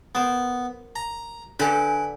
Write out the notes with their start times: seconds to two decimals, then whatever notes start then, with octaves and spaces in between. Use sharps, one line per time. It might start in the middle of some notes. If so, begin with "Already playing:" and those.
0.15 B3 A#4 C5
0.96 A#5
1.60 D3 D4 G4 A4 B4 G#5